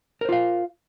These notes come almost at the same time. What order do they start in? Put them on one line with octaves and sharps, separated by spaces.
A#4 C5 F4 F5